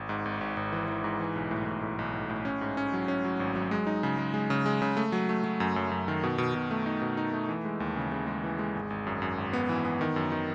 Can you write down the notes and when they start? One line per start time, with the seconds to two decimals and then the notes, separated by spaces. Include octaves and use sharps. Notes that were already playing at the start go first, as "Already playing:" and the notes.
Already playing: G#1
0.09 G#2
0.25 G#1
0.41 G#1
0.57 G#1
0.72 E3
0.88 E3
1.04 G#2
1.20 E3
1.36 B1
1.51 A2
1.67 A2
1.82 A2
1.99 B1
2.14 A2
2.30 A2
2.45 C#4
2.61 G#2
2.77 C#4
2.93 F#3
3.08 C#4
3.24 F#3
3.40 G#1
3.56 F#3
3.71 G#3
3.87 D#4
4.03 C#3
4.18 G#3
4.34 G#3
4.50 C#3
4.66 G#3
4.82 C#3
4.97 A3
5.12 F#3
5.29 A3
5.44 F#3
5.60 F#2
5.76 F#2
5.91 F#2
6.08 D#3
6.23 B2
6.38 B2
6.55 B2
6.71 A3
6.86 D#4
7.02 B2
7.17 D#4
7.33 A3
7.49 E3
7.65 G#3
7.80 D#2
7.96 C#3
8.12 C#3
8.27 G#3
8.44 E3
8.59 G#3
8.75 G#1
8.90 G#1
9.07 F#2
9.22 F#2
9.38 G#1
9.53 B3
9.69 E3
9.85 B3
10.01 D#3
10.16 F#2
10.32 D#3